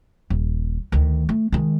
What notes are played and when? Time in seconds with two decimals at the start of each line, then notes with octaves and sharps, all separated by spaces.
0.30 D#1
0.92 D2 D#3
1.29 A3
1.52 D#3 G#3